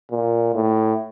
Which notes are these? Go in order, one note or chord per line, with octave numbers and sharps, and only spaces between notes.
A#2
A2